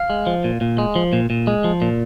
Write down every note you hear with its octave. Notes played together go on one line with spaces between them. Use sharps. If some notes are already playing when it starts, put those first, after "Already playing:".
Already playing: F5
G#3
F3
A#2
A#2
G#3
F3
A#2
A#2
G#3
F3
A#2